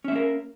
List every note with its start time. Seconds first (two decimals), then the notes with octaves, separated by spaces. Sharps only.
0.04 C#4
0.08 E5
0.12 A#3
0.16 A#4